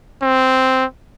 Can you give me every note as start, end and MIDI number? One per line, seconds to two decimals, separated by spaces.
0.22 0.85 60